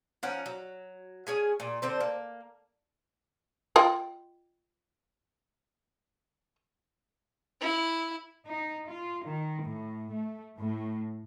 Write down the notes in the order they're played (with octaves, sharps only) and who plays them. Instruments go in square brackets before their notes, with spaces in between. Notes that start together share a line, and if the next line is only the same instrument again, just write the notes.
[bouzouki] F3 C#4 A#4 F#5
F#3
C#4 G#4 G#5
A#2
D3 C4 C5
A#3
[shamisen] F4 D#5 G5
[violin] E4
[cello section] D#4
F4
D#3
A2
A3
A2